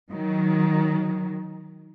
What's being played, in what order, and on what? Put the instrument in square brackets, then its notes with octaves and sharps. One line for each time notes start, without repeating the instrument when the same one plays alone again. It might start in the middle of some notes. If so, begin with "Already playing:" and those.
[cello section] D#3 F#3